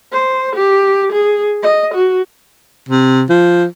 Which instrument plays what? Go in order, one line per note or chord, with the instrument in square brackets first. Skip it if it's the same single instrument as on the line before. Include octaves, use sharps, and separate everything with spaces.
[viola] C5
G4
G#4
D#5
F#4
[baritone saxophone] C3
F3